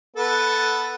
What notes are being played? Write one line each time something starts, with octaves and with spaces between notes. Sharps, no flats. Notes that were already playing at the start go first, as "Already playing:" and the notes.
B3 A4